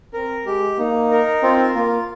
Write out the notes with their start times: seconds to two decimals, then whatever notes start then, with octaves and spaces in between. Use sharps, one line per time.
0.14 C4 A#4
0.46 G#3 G4
0.78 A#3 D#4
1.11 A#4
1.43 C4 F4
1.75 A#3 F4